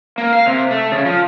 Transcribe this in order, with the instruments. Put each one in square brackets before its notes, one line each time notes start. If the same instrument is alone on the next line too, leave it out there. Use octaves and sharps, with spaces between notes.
[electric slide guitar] A#3
F5
C3
A3
C#3
F3